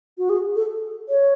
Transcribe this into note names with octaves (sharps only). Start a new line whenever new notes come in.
F#4
G#4
A4
C#5